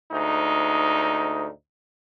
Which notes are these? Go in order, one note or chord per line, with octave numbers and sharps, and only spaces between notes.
D2 G#2 D#4